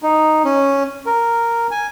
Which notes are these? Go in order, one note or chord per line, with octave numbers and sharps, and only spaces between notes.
D#4
C#4
A#4
G#5